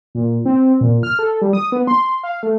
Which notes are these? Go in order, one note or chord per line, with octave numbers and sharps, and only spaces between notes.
A#2
C4
A#2
F6
A4
G3
D#6
B3
C6
F5
A3